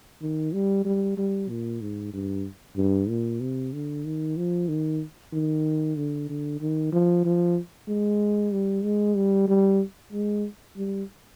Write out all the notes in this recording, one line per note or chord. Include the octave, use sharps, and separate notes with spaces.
D#3
G3
G3
G3
A#2
G#2
G2
G2
A#2
C3
D3
D#3
F3
D#3
D#3
D3
D3
D#3
F3
F3
G#3
G3
G#3
G3
G3
G#3
G3